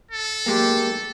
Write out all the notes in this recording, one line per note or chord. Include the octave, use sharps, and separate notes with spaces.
A4
B1 G#3 A#3 G4